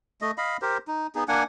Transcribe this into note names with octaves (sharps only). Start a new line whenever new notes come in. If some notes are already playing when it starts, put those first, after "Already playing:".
A3 D#5
D#5 F5 B5
G4 A#4 C5
D#4
B3 D#4 G#4
A#3 D4 F#5 G#5